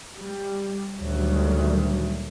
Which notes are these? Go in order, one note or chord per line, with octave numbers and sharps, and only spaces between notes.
G3
D2 A#2 D#3 F#3 G3 A3